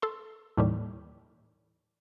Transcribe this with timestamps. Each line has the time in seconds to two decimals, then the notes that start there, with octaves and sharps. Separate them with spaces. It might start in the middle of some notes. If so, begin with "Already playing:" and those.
0.02 A4 C6
0.57 D#2 A2 E3 G3